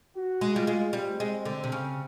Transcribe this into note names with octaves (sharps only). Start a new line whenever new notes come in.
F#4
G#3
G3 F4
G#3
G3 C4
G#3
D3
C3
C#3